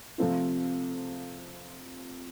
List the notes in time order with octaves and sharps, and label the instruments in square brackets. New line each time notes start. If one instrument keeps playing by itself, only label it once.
[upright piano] C3 F3 A3 C4 F4